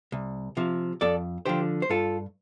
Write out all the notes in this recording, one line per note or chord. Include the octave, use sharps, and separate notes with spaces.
C2
C3 F3
F2 A4 D5
D3 F3 G4 C5
C5
G2 F4 A4